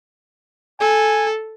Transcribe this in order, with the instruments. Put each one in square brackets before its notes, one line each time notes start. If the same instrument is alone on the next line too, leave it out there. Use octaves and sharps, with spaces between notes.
[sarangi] A4 [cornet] G#5